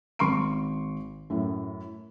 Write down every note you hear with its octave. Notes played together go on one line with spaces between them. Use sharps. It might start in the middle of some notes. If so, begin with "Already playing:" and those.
G#1 C6 C#6 C7 D7
F#2 A2